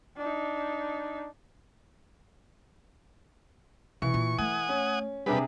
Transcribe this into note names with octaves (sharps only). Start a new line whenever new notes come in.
D4 D#4
C3 E3 C#6
A#2
A3 F#5 G#5 D#6
C#4
C3 G3 D4 G#4 B4